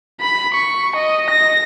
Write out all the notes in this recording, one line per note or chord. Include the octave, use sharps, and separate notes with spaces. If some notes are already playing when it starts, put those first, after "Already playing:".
B5
C#6
D#5
A#6